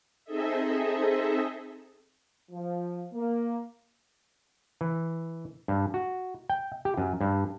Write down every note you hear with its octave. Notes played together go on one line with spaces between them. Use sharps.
C4 D#4 G#4 A4 D#5 E5
F3
A#3
E3
G2
F#4
G5
G4
F#2
G2